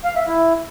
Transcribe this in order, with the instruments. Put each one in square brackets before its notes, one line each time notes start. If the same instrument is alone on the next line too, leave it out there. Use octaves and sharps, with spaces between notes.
[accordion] F5
E5
E4